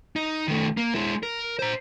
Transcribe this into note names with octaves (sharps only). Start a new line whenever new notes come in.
D#4
D#3 A3
A#3
G#3 E4
A#4
C5 A#5